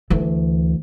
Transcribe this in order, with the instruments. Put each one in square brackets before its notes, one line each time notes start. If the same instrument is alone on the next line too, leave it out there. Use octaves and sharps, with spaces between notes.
[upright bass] D2 E3